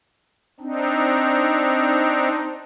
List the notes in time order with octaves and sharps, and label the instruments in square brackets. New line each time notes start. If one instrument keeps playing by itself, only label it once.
[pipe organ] C4 D4 D#4